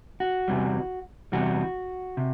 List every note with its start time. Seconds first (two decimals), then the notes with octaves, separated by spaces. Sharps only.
0.20 F#4
0.48 E2 C3 E3 G3
1.32 E2 C3 E3 G3 F#4
2.17 C3